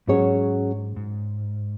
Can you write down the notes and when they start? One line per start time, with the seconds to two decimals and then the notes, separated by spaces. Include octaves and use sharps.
0.07 G#2 F#3 C#4 G#4 C#5
0.96 G#2